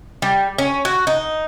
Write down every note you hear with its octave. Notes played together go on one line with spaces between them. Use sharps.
G3
C#4
F#4
D#4